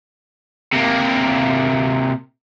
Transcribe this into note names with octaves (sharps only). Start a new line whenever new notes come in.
C3 A#3